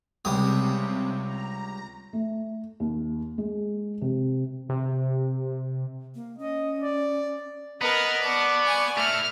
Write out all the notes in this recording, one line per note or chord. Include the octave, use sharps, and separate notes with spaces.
C#2 C3 G3 D#6
A#5
A3
D#2
G#3
C3
C3
A#3
C#4 D#5
D5
B3 A#4 B4 D#5
D5 A5 C#6
G#5
A3 E4 F6